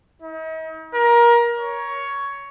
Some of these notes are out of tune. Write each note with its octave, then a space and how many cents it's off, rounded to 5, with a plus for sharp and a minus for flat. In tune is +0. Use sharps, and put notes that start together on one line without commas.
D#4 +45
A#4 +25
C#5 +10